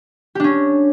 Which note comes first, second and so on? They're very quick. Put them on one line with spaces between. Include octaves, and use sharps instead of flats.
G4 D4 C#4